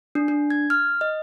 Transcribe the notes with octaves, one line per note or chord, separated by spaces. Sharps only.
D4
D4
G#6
F6
D#5